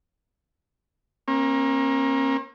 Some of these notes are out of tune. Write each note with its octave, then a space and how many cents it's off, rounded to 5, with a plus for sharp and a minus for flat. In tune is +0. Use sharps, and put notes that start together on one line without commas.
A#3 +15 C#4 -45